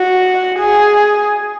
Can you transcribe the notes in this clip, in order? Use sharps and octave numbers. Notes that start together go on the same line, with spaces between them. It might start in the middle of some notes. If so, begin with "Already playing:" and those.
Already playing: F#4
G#4